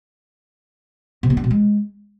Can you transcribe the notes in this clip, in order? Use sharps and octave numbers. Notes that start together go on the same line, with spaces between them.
C3
B3
D4
B2
G#3